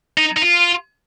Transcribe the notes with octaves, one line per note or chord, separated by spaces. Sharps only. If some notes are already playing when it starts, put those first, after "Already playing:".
D#4
D#4
F4